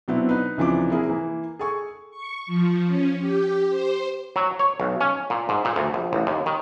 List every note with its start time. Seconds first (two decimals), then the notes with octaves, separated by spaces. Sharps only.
0.08 B2 F#3 B3 C4 D4 E4
0.29 D#4 B4
0.58 C#2 C3 E3 F3 D4 D6
0.90 C3 A#3 E4 G#4 A#4
1.09 E3 A#3
1.59 G#4 A4 G#5 C#6
2.10 C#6
2.47 F3
2.86 C#4
3.20 G4
3.69 C5
4.36 F#3
4.59 C#5
4.80 B1
5.01 C#4
5.30 A#2
5.49 G#2
5.65 A#2
5.76 D2
5.94 A#1
6.13 A1
6.27 D#2
6.46 D#3